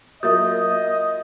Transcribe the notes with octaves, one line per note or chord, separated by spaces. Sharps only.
F#3 A#3 F4 A#4 D#5 E5 D#6 G6